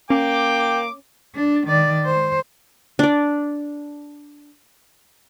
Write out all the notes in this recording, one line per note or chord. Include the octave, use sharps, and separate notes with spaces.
A#3 C#4 G5 D6
D4
D#3 D5
C5
D4 D5